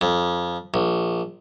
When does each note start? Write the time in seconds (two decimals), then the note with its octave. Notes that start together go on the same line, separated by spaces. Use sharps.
0.01 F2
0.74 A#1